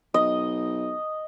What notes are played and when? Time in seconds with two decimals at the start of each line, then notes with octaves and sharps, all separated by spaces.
0.14 B1 D#5